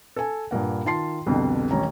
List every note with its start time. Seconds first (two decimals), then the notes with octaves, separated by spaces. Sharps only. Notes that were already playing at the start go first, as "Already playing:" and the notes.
0.16 A4 G#5
0.51 G2 A#2 A#3 F#5
0.85 D#3 F4 A5 C6 C7
1.26 C2 F2 B2 D3
1.71 D#1 A1 C#4 A#5